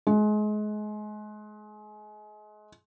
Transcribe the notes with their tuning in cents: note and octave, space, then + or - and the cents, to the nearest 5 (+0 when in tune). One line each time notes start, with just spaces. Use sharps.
G#3 +30